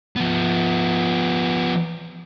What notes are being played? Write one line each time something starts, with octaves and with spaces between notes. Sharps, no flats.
F3 B3